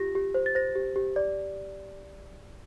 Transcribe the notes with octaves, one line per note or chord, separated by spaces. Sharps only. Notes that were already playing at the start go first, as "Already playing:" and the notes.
Already playing: F4 G4 A#6
G4
C5
A6
C5 A#6
G4
G4
D5